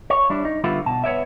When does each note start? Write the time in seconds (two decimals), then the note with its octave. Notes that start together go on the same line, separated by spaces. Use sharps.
0.10 C#5
0.30 G3 D4 E4
0.45 D#4
0.64 D3 G3 B3 E4 F4
0.86 B2 A5
1.04 B3 C#5 D5 E5